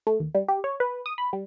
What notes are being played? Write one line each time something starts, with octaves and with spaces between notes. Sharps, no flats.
A3
D#2
G3
G4
C#5
B4
D#6
B5
G3